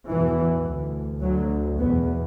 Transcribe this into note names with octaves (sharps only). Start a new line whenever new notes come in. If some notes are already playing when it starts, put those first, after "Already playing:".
E2 B2 E3
D2
D2 F#3
E2 B2 B3